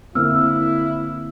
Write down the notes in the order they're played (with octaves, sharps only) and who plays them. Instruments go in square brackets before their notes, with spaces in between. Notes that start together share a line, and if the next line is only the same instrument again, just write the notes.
[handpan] D3 A#3 C4 [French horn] E4 [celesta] E6 F6